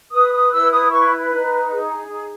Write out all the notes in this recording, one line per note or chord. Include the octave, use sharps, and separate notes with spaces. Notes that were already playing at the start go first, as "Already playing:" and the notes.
B4 D#6
D#6
E4 E6
D#6
B4 C#6
D#4
G#4
D#4